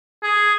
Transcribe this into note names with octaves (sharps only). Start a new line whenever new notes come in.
G#4